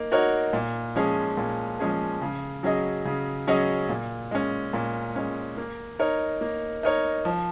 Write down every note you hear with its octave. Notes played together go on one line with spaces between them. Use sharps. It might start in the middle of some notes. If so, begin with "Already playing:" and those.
Already playing: A#3 D#4
D#4 F#4 A#4 C#5
A#2
F3 G#3 C#4 G#4
A#2
F3 G#3 C#4 G#4
C#3
F#3 C#4 G#4 D#5
C#3
F#3 C#4 G#4 D#5
A#2
G#3 C#4
A#2
G#3 C#4
A#3
D#4 A#4 C#5
A#3
D#4 A#4 C#5
F3